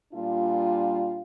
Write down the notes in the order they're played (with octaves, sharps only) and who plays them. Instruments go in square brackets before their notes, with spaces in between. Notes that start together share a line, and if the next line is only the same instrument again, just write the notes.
[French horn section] A#2 G3 D4 F4